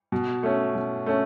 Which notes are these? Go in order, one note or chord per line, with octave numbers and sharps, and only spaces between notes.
B2
A3 C#4
B2
A3 C#4